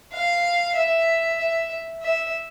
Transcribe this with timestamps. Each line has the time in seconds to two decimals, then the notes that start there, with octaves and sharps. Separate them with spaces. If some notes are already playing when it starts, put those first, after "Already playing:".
0.12 F5
0.75 E5
1.38 E5
2.02 E5